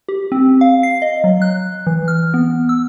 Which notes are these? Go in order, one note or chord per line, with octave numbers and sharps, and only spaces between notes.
G4
C4
F5
C7
D#5
F#3
F#6
E3
F6
B3
E6